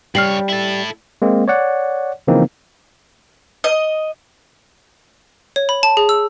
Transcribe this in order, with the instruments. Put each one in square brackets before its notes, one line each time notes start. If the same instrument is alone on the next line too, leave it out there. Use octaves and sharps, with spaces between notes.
[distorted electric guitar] G2 C#5 [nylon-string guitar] G3 [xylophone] F6 C7 F#7
[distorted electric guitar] E4 A4
[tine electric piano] G#3 A#3 C4
C#5 D5 F#5
C#3 E3 F3 A#3 C4 D#4
[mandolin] D#5
[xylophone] C#5
B5
A5
G#4
E6